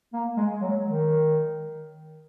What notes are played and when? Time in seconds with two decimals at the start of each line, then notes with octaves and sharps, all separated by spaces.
0.13 A#3
0.37 G#3
0.61 F#3
0.85 D#3